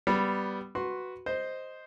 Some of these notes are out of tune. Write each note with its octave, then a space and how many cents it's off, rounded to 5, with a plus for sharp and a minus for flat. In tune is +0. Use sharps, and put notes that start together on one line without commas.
G3 -5 B3 +0
F#4 +0 B4 +0 C6 +15
C5 +0 D#5 +0